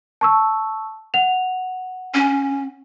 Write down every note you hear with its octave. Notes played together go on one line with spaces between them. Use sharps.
A5 C#6 E6
F#5 F7
C#4